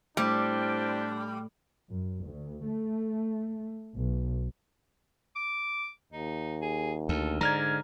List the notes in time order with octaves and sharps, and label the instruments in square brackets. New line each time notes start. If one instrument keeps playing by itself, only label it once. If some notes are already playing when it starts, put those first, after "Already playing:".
[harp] A2 [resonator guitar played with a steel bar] G3 [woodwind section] C4 E4 G4 [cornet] D4
[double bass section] F#2
D2
A3
B1
[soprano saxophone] D6
[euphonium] D#2 [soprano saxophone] D#4
[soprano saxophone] G#4
[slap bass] D2 [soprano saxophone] A4
[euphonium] G#2 [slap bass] D3 [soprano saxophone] D5 [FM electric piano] A#5 F6 G#6